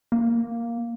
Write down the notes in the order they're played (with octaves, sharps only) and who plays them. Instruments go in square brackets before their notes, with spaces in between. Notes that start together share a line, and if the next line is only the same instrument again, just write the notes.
[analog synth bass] A#3